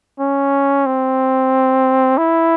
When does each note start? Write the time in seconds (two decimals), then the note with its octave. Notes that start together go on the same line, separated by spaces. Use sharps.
0.19 C#4
0.86 C4
2.18 E4